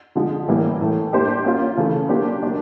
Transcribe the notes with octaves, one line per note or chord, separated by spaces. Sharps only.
D3 F3 G#3
A2 E3 G3 A#3
A2 E3 A3
A#3 D4 G4 C5
A#3 C#4 F4
C#3 E3 A3
F#3 A#3 D4 G4 C5
F#3 A#3 D4